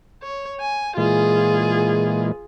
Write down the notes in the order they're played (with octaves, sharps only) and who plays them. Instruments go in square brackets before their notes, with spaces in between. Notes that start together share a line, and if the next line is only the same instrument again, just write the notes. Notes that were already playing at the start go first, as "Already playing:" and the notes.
[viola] C#5
G#5
[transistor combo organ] A#2 E3 G#3 [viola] F4 G#4